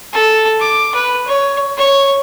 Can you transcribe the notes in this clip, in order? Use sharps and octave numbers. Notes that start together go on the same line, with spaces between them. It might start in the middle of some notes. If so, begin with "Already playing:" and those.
A4
D6
B4
C#5
C#5